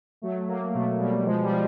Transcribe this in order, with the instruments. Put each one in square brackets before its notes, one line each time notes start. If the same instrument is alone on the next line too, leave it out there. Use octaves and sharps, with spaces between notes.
[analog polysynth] F#3 A3
F#3 A#3
B2 A3
B2 G3
F3 G#3
G3
F3